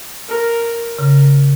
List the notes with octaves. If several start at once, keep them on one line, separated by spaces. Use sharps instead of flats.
A#4
C#3 A#4